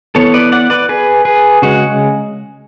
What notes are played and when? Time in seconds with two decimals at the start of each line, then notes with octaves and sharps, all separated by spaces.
0.15 E3 B3 A4 C#5
0.34 B4 D5
0.52 D5 F#5
0.70 B4 D5
0.89 G#4 B4
1.25 G#4 B4
1.62 C#3 G#3 F#4